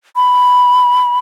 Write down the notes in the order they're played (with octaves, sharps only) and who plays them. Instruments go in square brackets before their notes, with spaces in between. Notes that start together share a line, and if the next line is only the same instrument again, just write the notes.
[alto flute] B5